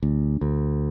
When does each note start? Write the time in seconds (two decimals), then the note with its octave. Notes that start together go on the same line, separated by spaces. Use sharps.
0.03 D2
0.41 D2